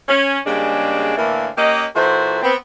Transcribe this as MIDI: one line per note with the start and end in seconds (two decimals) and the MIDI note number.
0.08 0.38 61
0.46 1.14 49
0.46 1.14 55
0.46 1.14 56
0.46 1.14 58
0.46 1.14 62
1.17 1.49 45
1.17 1.49 50
1.17 1.49 52
1.17 1.49 58
1.57 1.84 58
1.57 1.84 61
1.57 1.84 67
1.57 1.84 75
1.96 2.39 46
1.96 2.39 52
1.96 2.39 66
1.96 2.39 69
1.96 2.39 72
2.42 2.55 59
2.42 2.55 60